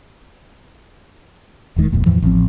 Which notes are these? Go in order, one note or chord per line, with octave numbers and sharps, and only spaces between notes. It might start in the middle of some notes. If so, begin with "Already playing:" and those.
D#1 E2 D#3 G#3
D1 F2 A#2
E2 A2 E3 F3
A1 F3 B3 C4